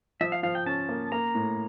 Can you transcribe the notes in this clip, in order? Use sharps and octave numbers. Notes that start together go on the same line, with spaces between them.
F3 E5
F5
F3 F5
G5
C#4 A5
A#3
A#3 A#5
A2